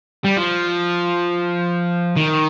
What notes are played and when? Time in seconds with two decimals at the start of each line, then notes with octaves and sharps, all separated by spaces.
0.24 G3
0.37 F3
2.17 D#3